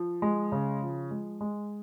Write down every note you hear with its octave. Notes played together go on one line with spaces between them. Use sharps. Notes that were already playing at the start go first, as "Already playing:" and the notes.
Already playing: F3
G#3
C#3
F3
G#3
G#3